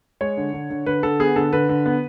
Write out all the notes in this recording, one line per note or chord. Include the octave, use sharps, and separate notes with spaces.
G#3 C#5
D3
D3
D3
D3 B4
D3 A4
B3 G#4
D3 A4
D3 B4
D3
B3